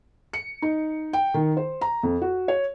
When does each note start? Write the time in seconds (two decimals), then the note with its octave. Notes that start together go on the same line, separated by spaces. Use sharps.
0.33 C#7
0.62 D#4
1.13 G5
1.34 D#3
1.57 C5
1.81 A#5
2.03 F2
2.22 F#4
2.48 C#5